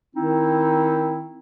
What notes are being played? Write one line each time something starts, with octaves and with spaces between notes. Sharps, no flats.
D#3 C4 D#4 E4